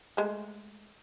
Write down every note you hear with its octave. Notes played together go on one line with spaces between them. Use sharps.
G#3 A3